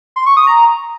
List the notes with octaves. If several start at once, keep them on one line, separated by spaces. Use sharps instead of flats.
C6
C#6
D#6
A#5